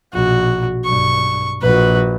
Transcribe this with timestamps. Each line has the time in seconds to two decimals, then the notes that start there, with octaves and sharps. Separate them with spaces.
0.13 A#1 B2 F#4
0.85 B1 G2 C#6
1.62 A#1 F#4 B4